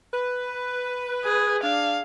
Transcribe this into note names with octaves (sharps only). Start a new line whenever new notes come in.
B4
G#4
D4 F5